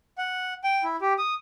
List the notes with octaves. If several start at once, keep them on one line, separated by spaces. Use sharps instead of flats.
F#5
G5
E4
G4
D#6